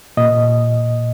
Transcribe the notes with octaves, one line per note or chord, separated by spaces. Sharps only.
A#2 D#5